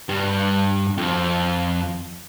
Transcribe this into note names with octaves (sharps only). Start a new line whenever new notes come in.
G2
F2